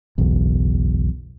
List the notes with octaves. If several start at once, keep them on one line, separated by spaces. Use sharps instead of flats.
F#1 B1 E2